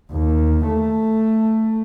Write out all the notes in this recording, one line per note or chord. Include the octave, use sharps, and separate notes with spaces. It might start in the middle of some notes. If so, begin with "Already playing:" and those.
D#2
A3